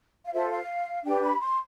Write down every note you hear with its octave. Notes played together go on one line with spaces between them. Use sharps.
F5
F4 A4 C5 E5
F5
D4 G4 B4 G5
B5
C6